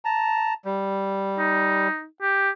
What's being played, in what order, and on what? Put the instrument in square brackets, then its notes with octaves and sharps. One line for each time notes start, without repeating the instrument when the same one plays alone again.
[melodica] A5 A#5
G3
[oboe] D#4
G4